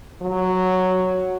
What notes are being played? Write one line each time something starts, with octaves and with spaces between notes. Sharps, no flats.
F#3